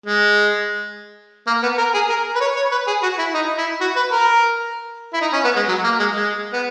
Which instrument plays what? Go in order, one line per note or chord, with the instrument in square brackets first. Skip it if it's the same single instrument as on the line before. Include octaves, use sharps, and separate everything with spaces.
[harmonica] G#3
A#3
B3
A#4
G#4
A#4
B4
C#5
C#5
B4
G#4
F#4
E4
D#4
E4
F#4
B4
A#4
E4
D#4
C#4
B3
G#3
F#3
A#3
G#3
G#3
B3